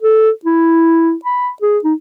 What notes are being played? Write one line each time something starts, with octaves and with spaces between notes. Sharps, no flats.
A4
E4
B5
G#4
D#4